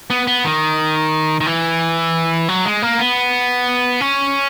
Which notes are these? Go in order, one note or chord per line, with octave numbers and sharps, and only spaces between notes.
B3
B3
D#3
D#3
E3
F#3
G#3
A#3
B3
C#4